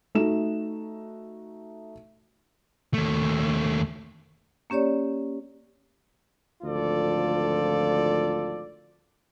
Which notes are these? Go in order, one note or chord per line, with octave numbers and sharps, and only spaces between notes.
A3 D#4 F#4 E7
D#2 A3
A#3 C#4 G4 C#5 D5
G#1 D2 F3 F4 A4 D5